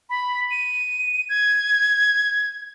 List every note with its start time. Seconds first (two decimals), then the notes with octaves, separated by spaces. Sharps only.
0.10 B5
0.51 D#7
1.29 G#6